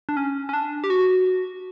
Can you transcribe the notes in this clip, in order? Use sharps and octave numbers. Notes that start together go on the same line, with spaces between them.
D4
C#4
C#4
D4
G4
F#4